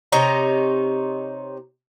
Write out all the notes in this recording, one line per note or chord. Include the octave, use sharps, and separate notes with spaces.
C3 D#4 C#5 A#5